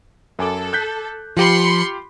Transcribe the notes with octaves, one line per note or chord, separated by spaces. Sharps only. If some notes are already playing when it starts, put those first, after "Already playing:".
F#2 A4 G#5 D6
F#6 G6 B6
F3 F4 G4 B5 C6 C#7